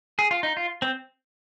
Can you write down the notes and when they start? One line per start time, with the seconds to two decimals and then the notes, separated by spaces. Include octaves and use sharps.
0.19 G#4
0.31 F4
0.43 D#4
0.57 F4
0.82 C4